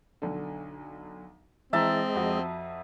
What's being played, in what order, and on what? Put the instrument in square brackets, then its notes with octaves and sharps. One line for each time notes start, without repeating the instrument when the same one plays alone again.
[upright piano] B1 D3
[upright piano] E3 [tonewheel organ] G#3 D#5 [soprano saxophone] C4 [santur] E5 A5 A#5
[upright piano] F2 F#4